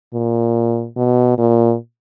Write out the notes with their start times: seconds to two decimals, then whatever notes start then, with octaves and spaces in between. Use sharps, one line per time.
0.13 A#2
0.96 B2
1.38 A#2